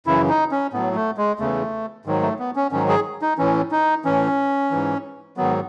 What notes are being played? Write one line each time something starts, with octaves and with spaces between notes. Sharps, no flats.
F#2 C#3 E3 E4
D#4
C#4
A2 F#3 B3
A3
G#3
E2 C#3 E3 A3
G#2 D#3 F#3
A3
B3
C#4
G#2 D#3 F#3 C#4
G#4
D#4
A2 E3 C#4
D#4
A2 E3 C#4
G#2 E3
G#2 D#3 F#3 B3